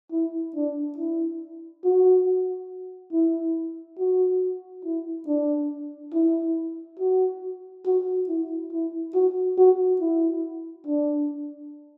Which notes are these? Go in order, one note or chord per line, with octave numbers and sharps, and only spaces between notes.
E4
D4
E4
F#4
E4
F#4
E4
D4
E4
F#4
F#4
E4
E4
F#4
F#4
E4
D4